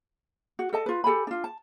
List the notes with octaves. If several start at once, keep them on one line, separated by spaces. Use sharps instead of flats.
F#4
A4 D#5 A5
F4 B4
G4 A4 G#5 B5
D4 F4
A5